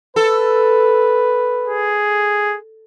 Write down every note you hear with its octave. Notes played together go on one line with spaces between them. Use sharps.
A4 B4
G#4